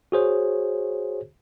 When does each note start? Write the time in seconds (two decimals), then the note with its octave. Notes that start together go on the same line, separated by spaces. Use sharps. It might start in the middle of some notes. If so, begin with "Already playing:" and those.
0.12 F#4 G#4 C5 C#5